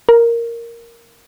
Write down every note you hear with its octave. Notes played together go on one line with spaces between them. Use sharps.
A#4